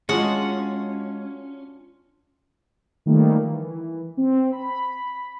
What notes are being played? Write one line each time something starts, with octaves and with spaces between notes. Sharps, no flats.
G#3 C#4 D4 F4 F#4 F#5
D#3 F3 G3 A3 A#3
E3
C4
B5